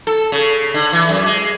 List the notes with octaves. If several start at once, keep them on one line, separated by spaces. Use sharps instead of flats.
A4
C#3
D3
E3
F#2
G#3